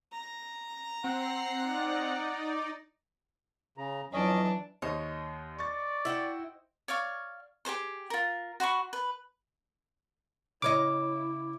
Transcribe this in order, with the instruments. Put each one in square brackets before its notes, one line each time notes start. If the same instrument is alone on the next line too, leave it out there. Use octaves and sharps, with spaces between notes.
[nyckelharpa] A#5
[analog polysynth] C4 [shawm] F#5 [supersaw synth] C7
[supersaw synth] D#4 D5
[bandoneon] C#3 [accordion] A#5
[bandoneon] F2 C#4 D#5 [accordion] E3 [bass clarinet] F#3 [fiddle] D4
[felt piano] D#2 [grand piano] C5 D#5 [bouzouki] C#5
[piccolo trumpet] D5 [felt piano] C#6 A6
[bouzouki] E4 F#4 G5
[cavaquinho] C#5 D5 F5 C#6
G4 G#4 C5 C6
F4 A#4
F#4 C5 B5 C#6
B4
[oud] C#3 C#5 D#5 [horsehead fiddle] E4 [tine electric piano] D6